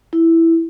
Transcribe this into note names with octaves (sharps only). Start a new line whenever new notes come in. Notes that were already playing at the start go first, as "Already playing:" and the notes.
E4